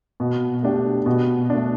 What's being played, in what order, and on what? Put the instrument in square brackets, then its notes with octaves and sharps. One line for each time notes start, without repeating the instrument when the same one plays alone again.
[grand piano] B2
A3 D4 G4
B2
A3 D4